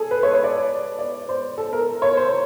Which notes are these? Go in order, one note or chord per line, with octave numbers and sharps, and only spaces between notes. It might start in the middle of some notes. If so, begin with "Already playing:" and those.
Already playing: G#4 A4
B4
C#5
C#5
D5
D5
C5
A4
A#4
C#5
C5